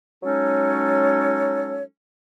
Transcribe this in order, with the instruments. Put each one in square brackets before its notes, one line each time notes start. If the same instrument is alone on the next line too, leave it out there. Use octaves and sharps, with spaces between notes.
[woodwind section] F#3 G#3 C#4 D#4 A4 C#5